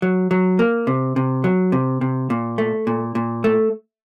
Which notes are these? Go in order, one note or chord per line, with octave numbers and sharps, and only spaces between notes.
F#3
F#3
A#3
C3
C3
F#3
C3
C3
A#2
A3
A#2
A#2
A3